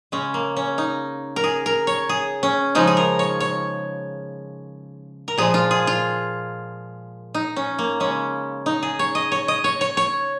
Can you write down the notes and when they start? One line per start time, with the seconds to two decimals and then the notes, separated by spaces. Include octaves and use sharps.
0.12 C#3 G#3 C#4
0.34 A#3
0.57 C#4
0.78 D#4
1.36 A#4
1.44 G#4
1.66 A#4
1.87 C#5
2.09 G#4
2.43 C#4
2.75 C#3 F3 G#3 D#4
2.87 G#4
2.97 A#4
3.19 C#5
3.40 C#5
5.28 A#4
5.38 A#2 F3 G#3 G#4
5.54 F4
5.71 G#4
5.87 F4
7.34 D#4
7.56 C#4
7.79 A#3
8.00 C#3 G#3 C#4
8.66 D#4
8.83 G#4
8.99 C#5
9.15 D#5
9.32 C#5
9.48 D#5
9.64 C#5
9.81 C#5
9.97 C#5